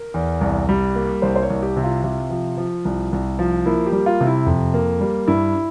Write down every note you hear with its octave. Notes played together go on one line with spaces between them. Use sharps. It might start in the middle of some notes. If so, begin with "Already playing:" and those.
Already playing: A#4
E2
C2
G3
A#3
C2 C5
C5
C#5
C2
G4
C3
F4
C3 F4
F3
F3
C2
C2
F3
A#3 E4
G4
G3
F4
C3
E4
F2
A#3
G3
G2 E4